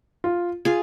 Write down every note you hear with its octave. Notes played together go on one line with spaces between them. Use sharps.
F4
F4 G#4